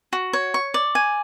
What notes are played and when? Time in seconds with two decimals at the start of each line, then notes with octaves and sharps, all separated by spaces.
0.13 F#4
0.33 C#5
0.54 C#6
0.74 D5
0.95 G#5